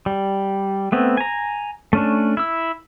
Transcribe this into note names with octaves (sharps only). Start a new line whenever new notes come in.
G3
A3 B3 C4
G#5 A#5
A3 C#4 D4
E4 E6